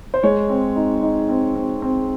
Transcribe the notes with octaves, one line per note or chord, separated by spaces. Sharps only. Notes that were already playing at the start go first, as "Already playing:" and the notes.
C5
G#3 C#5
C4
D#4
D#4
C4
C4
C4